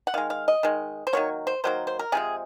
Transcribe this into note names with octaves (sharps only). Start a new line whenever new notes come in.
F#5
D#3 G#3 F5
F5
D#5
D#3 G#3
C5
D#3 F#3 A#3 C#5
C5
D#3 F#3 A#3 C5
C5
A#4
C3 F3 G#3 G#4